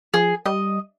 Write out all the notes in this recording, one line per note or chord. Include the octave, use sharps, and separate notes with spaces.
F3 G#4
G3 D#5